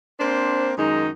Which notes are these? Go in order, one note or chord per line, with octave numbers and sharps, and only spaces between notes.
A#3 C4 D4 C5
F#2 D#3 G#3 D#4